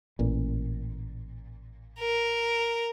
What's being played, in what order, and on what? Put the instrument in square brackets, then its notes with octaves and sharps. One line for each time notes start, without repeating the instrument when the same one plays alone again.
[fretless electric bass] A1 A#2
[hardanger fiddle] A#4